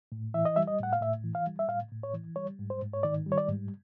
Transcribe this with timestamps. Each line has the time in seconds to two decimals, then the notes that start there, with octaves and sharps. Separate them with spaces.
0.12 A2
0.34 E3 E5
0.45 D#5
0.56 G3 E5
0.67 D#5
0.80 A2 F#5
0.93 F5
1.01 A2 E5
1.24 E3
1.35 F5
1.47 G3
1.59 E5
1.69 A2 F5
1.91 A2
2.03 C#5
2.13 E3
2.36 G3 C#5
2.59 G#2
2.70 C5
2.82 G#2
2.94 C#5
3.03 D#3 D5
3.26 G3
3.32 C#5
3.38 D5
3.48 G#2